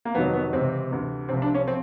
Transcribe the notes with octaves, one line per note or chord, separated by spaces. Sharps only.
A#3
F2 C3 D#3 F#3 B3
B3
C#2 C3 E3 C4
D2 C3 E3
C2 C3 F3 C4
D4
C#4
F3 C4